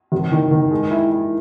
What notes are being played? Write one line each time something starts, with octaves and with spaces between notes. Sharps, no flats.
G#1
D#3
D#3
G#3
E4
E4